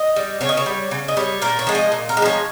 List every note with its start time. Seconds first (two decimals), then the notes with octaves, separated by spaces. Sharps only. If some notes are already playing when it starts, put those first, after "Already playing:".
Already playing: D#5
0.16 G3
0.41 C#3 C#5
0.49 D#5
0.57 C#5
0.66 G3
0.91 C#3
1.08 D#5
1.17 G3 C#5
1.42 A#2 A#4
1.59 C#5
1.67 F3 G#3
1.75 D#5
1.92 A#2
2.09 A#4
2.17 G#3
2.22 F3 C#5